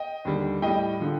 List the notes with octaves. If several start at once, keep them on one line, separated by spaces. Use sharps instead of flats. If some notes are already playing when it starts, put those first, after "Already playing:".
Already playing: D#5 G5
D#2 D3 G3
A2 G3 D#5 G5
D3 F3